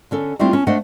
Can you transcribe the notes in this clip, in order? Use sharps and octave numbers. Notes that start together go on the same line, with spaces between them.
D3 C#4 A4
G3 A3 C4 D4 E4 F4
C#4 A5
A3 D4 C5 D#5 F5 F#5